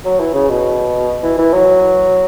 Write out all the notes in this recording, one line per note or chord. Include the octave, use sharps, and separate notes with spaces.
F#3
E3
C#3
B2
E3
E3
F#3